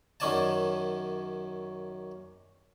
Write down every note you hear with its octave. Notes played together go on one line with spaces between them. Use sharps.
F#2 D#3 C#4 D5 G#5 A5